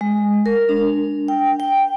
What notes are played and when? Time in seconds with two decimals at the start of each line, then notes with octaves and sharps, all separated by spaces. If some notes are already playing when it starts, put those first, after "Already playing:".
0.01 G#3
0.46 A#4
0.69 D4
1.28 G5
1.60 G5